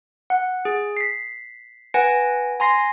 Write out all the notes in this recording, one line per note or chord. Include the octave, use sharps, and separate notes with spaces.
F#5
G#4
B6 C7
B4 F#5 G#5 A#6 D7
G#5 A#5 C6 A#6 C7